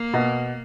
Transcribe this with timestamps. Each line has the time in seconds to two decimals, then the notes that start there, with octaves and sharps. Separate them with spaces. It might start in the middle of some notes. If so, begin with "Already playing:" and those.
Already playing: A#3
0.14 B2